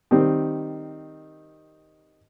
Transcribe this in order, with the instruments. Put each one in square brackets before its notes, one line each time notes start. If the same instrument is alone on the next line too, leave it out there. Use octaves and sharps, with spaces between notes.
[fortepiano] D#3 G3 C4